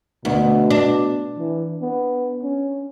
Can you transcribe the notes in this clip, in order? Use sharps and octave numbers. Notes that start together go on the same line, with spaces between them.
D2 B2
D4
E3
B3
C#4